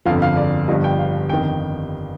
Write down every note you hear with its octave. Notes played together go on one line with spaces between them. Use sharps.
G1 F2 D3 F3 F5
F5
D5
G1 G2 F3 D#5
G5
F5
G1 F2 D#3 G5